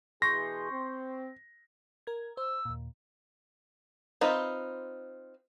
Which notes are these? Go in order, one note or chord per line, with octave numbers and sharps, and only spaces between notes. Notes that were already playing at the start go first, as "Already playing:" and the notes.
B2 E3 G#4 C6 C#6 G6 A#6
C4
A#4 G#6
C5 E6
D#2 A#2
C4 D#4 F4 B4